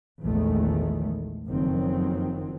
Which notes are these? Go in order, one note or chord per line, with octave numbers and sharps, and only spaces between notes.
A#1 E2 D#3 F3 G#3 A3
F#1 F2 D#3 F3 F#3 C4